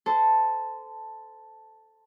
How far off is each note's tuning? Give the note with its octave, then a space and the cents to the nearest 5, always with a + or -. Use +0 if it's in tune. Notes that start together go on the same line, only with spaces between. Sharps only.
A4 +0 C5 -20